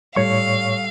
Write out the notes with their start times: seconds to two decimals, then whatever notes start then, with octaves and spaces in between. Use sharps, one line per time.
0.16 A2 G3 A4 C#5 F5 C#6